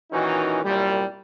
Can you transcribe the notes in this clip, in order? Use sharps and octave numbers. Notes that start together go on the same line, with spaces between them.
A#2 D#3 E3 C#4 D#4 F#4
C2 F#2 A#2 G3